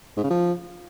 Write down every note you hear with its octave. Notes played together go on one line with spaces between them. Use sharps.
G#2
C#3
F3